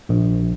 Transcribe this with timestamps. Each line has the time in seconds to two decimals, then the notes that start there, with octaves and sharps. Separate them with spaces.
0.09 A#1